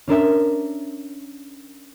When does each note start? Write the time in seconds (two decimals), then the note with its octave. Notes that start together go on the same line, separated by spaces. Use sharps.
0.08 C#4 D4 A#4 E5